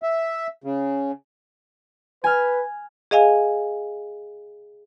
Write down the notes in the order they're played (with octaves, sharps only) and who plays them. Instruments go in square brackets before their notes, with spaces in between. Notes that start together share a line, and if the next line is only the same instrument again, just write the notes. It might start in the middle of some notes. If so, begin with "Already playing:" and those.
[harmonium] E5
C#3
[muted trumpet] B4 [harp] G#5 F6
[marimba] G#4 D#5 F5 G#5